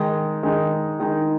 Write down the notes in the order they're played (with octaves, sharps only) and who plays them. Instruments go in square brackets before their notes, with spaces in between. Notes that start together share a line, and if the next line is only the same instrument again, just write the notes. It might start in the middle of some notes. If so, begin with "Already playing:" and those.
Already playing: [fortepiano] D#3 G#3 D#4
D#3 G#3 D#4
D#3 G#3 D#4